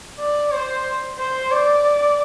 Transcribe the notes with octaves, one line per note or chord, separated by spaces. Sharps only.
D5
C5
C5
D5